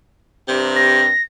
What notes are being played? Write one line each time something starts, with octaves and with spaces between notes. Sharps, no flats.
G2 C3
A#6